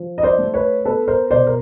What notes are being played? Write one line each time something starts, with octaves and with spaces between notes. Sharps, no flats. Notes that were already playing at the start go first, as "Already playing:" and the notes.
Already playing: F3
D#5
C5 D5
A3
B4 C#5
B3 A4 B4
A#4 C5
B2 C5 D5
A#4